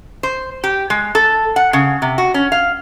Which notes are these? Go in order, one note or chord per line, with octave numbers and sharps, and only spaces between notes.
C5
G4
G#3
A4
F#5
C#3
C3
F#4
C#4
F5